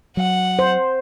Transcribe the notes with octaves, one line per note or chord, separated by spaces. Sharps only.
F#3 F#5
C5